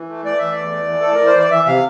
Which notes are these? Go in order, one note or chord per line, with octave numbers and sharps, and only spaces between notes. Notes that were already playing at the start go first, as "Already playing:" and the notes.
Already playing: E3
A3
A3 D5
E3 E5
E2 D5
A3
E3
E3 A4
A#4
E3
C5
E3 D5
E3 E5
C3 F5